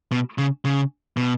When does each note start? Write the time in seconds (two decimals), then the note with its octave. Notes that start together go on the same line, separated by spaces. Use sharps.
0.11 B2
0.38 C#3
0.65 C#3
1.17 B2